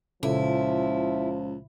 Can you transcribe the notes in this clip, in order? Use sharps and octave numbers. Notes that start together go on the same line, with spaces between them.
C#2 A#2 C#3 F3 E4 A4